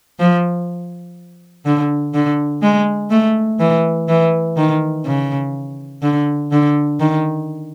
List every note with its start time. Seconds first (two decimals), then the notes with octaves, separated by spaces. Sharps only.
0.19 F3
1.65 D3
2.14 D3
2.62 G#3
3.10 A3
3.59 E3
4.08 E3
4.57 D#3
5.05 C#3
6.02 D3
6.51 D3
7.00 D#3